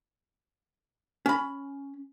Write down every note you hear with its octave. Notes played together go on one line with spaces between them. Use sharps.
C#4 B5